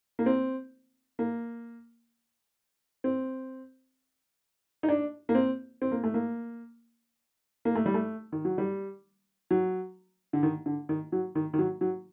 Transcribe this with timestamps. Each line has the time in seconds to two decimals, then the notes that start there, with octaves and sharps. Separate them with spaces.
0.19 A#3
0.26 C4
1.19 A#3
3.04 C4
4.83 D#4
4.88 D4
5.29 A#3
5.35 C4
5.82 C4
5.92 A#3
6.03 A3
6.14 A#3
7.65 A#3
7.75 A3
7.86 G3
7.94 A3
8.32 D#3
8.45 F#3
8.58 G3
9.51 F#3
10.33 D3
10.43 D#3
10.66 D3
10.89 D#3
11.12 F#3
11.35 D#3
11.54 D#3
11.58 F#3
11.81 F#3